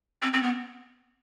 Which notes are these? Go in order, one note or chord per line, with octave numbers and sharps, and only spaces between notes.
C4
C4
B3